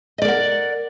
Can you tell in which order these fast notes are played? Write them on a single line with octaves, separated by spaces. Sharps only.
D#5 D5 A#4 F#5